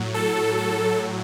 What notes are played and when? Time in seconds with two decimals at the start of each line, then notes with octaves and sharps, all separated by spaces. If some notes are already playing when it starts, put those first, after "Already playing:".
Already playing: A2 F#3
0.14 A4
0.57 A4